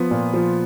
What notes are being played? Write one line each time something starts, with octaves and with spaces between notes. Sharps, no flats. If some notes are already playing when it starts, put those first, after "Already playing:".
Already playing: F3 B3
A#2
F3